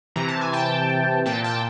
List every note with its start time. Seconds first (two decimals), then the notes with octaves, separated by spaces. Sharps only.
0.16 C3 E3 A#5
0.28 A5
0.41 G#5
0.53 G5 A5
1.26 A#2 G5 A5
1.44 G5 A5